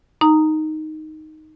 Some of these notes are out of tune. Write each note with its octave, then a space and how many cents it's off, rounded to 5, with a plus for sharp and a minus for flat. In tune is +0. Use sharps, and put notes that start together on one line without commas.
D#4 +0 A#5 -10